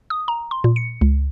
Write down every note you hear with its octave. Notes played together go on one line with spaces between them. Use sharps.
D#6
A#5
C6
A#2
C#7
C#2